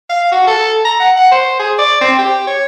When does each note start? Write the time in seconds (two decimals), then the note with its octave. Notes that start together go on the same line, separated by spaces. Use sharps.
0.09 F5
0.32 F#4
0.47 A4
0.85 A#5
1.00 F#5
1.16 F#5
1.31 C5
1.59 G#4
1.78 D5
2.01 C4
2.18 G4
2.47 C#5